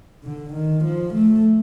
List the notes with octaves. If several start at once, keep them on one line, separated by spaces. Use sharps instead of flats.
D3
D#3
F3
A3